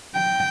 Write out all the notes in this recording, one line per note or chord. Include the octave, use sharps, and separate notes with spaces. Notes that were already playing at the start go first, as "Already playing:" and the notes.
G5